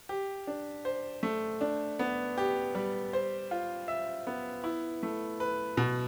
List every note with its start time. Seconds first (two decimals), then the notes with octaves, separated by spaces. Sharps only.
0.09 G4
0.47 D4
0.85 C5
1.23 A3
1.61 D4
1.99 B3
2.38 G4
2.75 G3
3.13 C5
3.51 F4
3.88 E5
4.27 B3
4.64 E4
5.03 A3
5.40 B4
5.77 B2